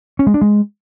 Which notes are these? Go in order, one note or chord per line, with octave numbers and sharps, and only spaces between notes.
C#4
G#3
D4
G#3